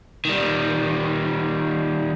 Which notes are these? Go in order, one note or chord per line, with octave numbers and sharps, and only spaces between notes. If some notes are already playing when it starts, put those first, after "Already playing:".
D#3 G3